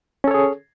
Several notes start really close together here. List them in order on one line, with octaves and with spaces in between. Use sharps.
C#4 A4 C#5 G#4